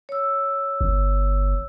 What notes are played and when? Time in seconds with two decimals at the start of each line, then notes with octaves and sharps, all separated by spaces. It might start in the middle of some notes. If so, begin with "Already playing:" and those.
0.09 C#5 E6
0.81 G1